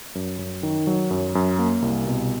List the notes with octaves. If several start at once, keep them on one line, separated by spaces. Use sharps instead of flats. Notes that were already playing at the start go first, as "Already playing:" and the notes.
F#2
F#2
D#3
F#3
F#2
F#2
A#3
C2
B2